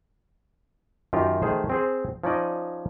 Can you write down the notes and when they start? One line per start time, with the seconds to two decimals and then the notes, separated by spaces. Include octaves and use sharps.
1.13 F#2 D#3 F4 G4 A#4
1.42 D#3 A3 G#4 C5
1.69 C4 G#4 C5
2.24 F3 C#4 D#4 D5 D#5